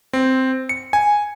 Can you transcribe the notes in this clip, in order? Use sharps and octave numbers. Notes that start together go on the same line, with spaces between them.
C4
C#7
G#5